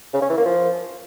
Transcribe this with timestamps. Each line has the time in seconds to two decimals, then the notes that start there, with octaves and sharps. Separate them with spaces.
0.14 C#3
0.22 C#4
0.30 E3
0.38 A#3
0.46 F3